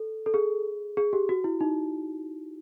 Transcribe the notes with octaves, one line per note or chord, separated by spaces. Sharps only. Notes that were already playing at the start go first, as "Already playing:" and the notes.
Already playing: A4
A4
G#4
G#4
G4
F#4
E4
D#4